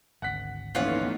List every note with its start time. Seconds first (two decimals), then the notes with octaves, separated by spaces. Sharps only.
0.22 G#1 D2 F#5 F#6 B6
0.75 A#1 E3 A3 B3 C#4 D#4 F4 F#5